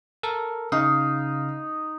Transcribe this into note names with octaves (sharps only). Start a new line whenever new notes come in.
A4 A#4
C#3 D#4 F5